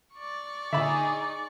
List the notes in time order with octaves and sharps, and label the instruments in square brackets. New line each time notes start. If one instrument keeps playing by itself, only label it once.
[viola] D5 C#6
[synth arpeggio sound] A#2 D3 [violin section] D#4 G#4 [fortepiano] E5 B5